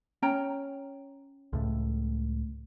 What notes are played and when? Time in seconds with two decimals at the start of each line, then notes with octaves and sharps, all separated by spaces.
0.22 C#4 G5 A#5
1.53 C#2 A2